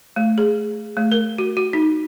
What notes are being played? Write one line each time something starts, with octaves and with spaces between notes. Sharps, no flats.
A3
G#4
A3
A#4
F#4
F#4
D#4